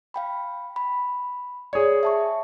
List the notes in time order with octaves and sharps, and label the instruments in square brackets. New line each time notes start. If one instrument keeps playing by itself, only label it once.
[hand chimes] F5 G5 B5
B5
[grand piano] G#4 C#5 [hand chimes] D5
[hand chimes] E5 A5 C#6